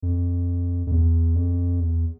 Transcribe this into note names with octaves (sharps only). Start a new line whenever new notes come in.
F2
F2
E2
F2
E2